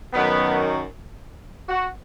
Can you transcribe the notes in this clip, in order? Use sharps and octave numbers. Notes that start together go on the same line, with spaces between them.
F#2 D#3 F#3 B3
F#4